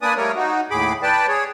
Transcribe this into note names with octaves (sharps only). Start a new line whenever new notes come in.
A#3 D4 B4 D5 G#5 D#6
G3 A3 A#3 A#4 C#5
D#4 F#4
D#2 A2 G#4 B5 D6
B4 D5 G5 A5
G#4 C#5